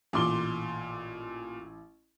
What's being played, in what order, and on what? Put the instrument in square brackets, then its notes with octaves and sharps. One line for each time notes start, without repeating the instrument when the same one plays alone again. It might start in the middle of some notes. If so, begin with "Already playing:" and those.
[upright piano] A1 D6 G7 [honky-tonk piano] A#2 C6